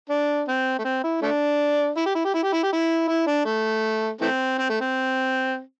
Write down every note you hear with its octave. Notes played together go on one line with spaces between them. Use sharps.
D4
C4
A3
C4
E4
A3 D4
E4
G4
E4
G4
E4
G4
E4
G4
E4
E4
D4
A3
E3 A3 C4
C4
A3
C4